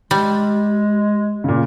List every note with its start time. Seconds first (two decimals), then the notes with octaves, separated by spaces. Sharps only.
0.11 G3 G#3
1.44 A#2 C#3